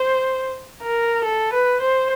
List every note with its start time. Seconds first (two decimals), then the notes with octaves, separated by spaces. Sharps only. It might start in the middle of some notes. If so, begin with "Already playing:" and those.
Already playing: C5
0.83 A#4
1.24 A4
1.53 B4
1.81 C5